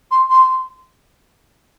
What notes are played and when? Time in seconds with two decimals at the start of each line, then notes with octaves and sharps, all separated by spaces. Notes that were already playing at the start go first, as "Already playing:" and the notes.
0.11 C6
0.30 C6